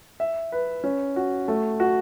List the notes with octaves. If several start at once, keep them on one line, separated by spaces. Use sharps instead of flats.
E5
B4
C#4
F#4
A3
F#4